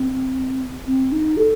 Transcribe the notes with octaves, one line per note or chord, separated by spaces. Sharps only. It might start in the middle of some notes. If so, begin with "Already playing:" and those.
Already playing: C4
C4
D#4
A4